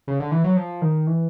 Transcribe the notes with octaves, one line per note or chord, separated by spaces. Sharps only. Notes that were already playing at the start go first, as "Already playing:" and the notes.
C#3
D3
E3
F#3
F3
D#3
E3